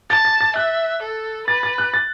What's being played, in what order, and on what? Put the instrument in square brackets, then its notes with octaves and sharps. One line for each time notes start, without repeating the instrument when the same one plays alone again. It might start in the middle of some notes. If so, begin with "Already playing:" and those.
[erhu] A5 [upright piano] A6
[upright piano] A6
A6
[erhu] E5 [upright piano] F#6
[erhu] A4
[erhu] B4 [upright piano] A6
[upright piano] A6
F#6
A6